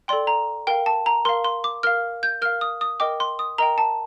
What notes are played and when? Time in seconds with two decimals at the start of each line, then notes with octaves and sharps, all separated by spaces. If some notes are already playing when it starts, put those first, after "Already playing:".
0.08 A4 D5 G5 C6
0.27 A#5
0.67 A#4 F5 G5
0.86 A5
1.06 A#5
1.25 A#4 C6
1.29 F5
1.45 C6
1.64 D6
1.83 A#4 F5 F6
2.23 G6
2.42 A#4 F6
2.45 F5
2.61 D#6
2.81 D#6
3.00 A#4 D#5 G5 D6
3.20 C6
3.39 D#6
3.58 A#4 D#5 G5 A#5
3.78 A5